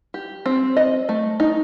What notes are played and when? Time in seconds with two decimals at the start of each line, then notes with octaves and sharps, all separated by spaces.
0.14 G4
0.46 C4
0.77 D#5
1.09 A3
1.40 D#4